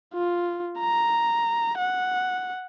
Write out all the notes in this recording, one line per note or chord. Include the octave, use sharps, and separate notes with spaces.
F4
A#5
F#5